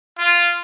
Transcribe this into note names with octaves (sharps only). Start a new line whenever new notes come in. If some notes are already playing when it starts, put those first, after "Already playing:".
F4